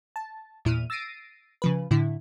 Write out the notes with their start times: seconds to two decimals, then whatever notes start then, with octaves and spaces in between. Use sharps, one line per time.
0.16 A5
0.65 E2 A#2 E4 F6 D#7
0.90 E6 A6 A#6 C7 D7 D#7
1.62 C#3 F3 B4
1.91 A2 D3 E4